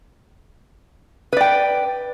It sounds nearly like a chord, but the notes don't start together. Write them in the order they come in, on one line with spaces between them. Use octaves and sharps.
B4 D5 G5